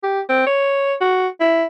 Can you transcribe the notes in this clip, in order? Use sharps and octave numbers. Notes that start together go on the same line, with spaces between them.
G4
C4
C#5
F#4
E4